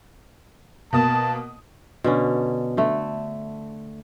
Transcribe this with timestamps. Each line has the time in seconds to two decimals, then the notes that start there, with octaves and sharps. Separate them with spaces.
0.93 B2 A#3 A5 D#6
2.04 B2 D3 C#4
2.77 D3 A3